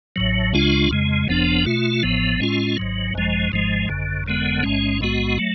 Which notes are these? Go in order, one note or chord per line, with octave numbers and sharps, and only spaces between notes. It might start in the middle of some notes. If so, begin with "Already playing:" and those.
A1 A2 F#3
C#2 C#3 G#3 D4 F4
F2 C#3 G#3
F#1 F2 F3 B3 D4
B2 A3 F4
A1 A2 F3 B3
A2 G#3 C#4 F4
G#1 G#2 F#3
G#1 F#2 F3 G#3
G#1 G#2 F3 G#3
G#1 F#2 D3
F#1 F2 D3 G#3 B3
A1 G#2 G#3 C#4
B1 A2 G#3 B3 F#4
F#3 A3